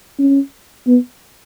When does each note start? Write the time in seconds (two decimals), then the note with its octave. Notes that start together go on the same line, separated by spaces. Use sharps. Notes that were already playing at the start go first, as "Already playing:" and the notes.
0.19 C#4
0.87 B3